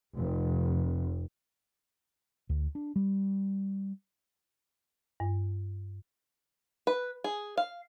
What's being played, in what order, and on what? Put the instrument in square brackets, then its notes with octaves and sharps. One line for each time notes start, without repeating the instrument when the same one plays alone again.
[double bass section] F1
[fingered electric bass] D2
D4
G3
[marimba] G2
[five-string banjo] B4
G#4
F5